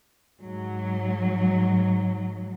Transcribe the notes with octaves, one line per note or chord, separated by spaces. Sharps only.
G#2 F#3